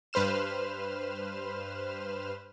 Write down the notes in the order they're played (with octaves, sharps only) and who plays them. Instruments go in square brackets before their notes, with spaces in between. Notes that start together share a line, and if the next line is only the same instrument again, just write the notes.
[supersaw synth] G2 B4 C5 F6 E7